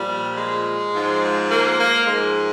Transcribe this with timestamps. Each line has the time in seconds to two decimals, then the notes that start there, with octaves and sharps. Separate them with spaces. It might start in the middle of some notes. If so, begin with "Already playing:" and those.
Already playing: A#2 F3 G3
0.35 G#3
0.92 G#2 F3
1.49 A#3
1.78 A#3
2.06 G#2 F3 G#3